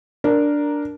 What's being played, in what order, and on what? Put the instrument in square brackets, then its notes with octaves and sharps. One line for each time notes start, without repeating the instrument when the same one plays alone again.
[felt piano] D4 A#4